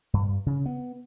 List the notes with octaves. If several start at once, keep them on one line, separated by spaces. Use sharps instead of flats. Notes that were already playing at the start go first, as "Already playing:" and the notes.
G2
C#3
B3